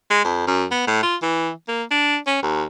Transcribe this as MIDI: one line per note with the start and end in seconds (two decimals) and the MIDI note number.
0.10 0.24 56
0.24 0.45 41
0.47 0.65 42
0.71 0.86 59
0.87 1.02 45
1.03 1.16 65
1.22 1.51 52
1.68 1.83 58
1.91 2.17 62
2.27 2.40 61
2.43 2.64 39